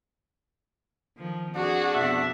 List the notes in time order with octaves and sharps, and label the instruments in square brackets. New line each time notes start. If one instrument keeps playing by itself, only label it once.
[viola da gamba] D#3 F3
[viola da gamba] F2 G#4 [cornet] D4 [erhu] F#4
[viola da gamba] F2 B2 [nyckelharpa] E5